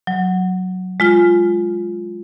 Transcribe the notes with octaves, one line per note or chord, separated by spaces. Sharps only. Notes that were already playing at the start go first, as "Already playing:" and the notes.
F#3
G#3 F4 F6